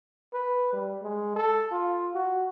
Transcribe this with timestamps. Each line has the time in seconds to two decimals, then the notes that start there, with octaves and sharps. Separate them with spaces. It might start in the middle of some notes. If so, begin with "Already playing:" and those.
0.33 B4
0.73 G3
1.03 G#3
1.36 A4
1.72 F4
2.14 F#4